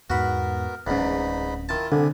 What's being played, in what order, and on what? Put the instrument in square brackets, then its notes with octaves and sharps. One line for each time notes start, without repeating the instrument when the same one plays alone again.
[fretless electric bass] E2 G#2 [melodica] B3 A#4 [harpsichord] F#4 B5
[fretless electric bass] D1 C#4 [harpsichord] E2 G#2 [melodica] D#4 B5
[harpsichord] D#3 A5 [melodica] E4 F4
[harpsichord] C2 [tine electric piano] D3 [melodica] D4 G#5 B5